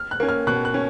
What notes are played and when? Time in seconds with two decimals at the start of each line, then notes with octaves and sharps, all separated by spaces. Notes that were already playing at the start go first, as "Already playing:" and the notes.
Already playing: F6
0.11 F#6
0.20 A#3 C#4
0.29 F6
0.47 B2 F#6
0.65 F#6
0.74 C#4